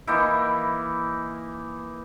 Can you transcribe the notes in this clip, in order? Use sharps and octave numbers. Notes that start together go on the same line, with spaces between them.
E3 A#3 D#4 E4